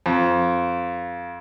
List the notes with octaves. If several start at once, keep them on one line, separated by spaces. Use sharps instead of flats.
F2